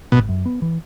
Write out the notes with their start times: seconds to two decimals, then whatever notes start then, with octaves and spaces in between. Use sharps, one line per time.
0.12 G#1 B2
0.29 F#2
0.46 B3
0.62 E3